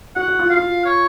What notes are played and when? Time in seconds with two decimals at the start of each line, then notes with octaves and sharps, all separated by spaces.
0.16 F#4 F#5
0.28 F#4
0.39 F4
0.48 F#4 F5
0.57 F4
0.85 C#5